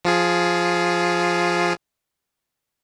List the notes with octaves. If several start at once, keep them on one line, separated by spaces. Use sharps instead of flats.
F3 F4 G#4